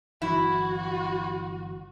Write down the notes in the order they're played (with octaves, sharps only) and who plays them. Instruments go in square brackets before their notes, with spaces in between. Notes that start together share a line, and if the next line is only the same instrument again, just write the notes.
[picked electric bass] G1 E3 F#3 [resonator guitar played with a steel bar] E4 [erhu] F#4